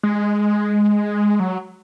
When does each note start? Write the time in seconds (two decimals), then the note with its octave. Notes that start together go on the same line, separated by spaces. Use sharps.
0.03 G#3
1.40 F#3